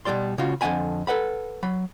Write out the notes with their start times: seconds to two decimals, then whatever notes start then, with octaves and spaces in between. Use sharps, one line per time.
0.05 B2 F#3 G3 D5 C6
0.38 C#3 C#4 F4 F#4
0.61 F2 D3 A3 F#5 G#5 B5
1.07 A4 B4 F#5 B5
1.63 F#3 B5